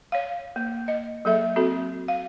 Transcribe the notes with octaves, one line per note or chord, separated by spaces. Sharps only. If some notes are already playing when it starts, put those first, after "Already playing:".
C#5 F5
A#3
D#5
F#3 A#3 G#4 A4 E5
C4 F#4 A4
F5